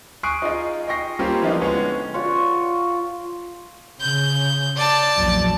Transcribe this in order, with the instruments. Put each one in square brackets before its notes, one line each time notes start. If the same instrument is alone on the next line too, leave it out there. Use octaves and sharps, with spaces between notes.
[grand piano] G#5 C#6 D#6 F#6 C7 D7
D#4 F4 G#4 D#5
D#5 G5 C#6 A#6 C7
G3 A#3 C4 C#4 F4 G4
E3 F3 A#3 D4 D#4 F4
D3 G#3 B3 C#4
[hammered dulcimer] F4 F#4 C#5
[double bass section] C#3 [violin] G6
[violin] D5 A5
[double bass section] A#1 E2 F#3